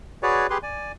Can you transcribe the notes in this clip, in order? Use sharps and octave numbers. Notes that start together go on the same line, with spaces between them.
F#4 G#4 B4 C#5 D5
G4 G#4 B4 C6
D5 G#5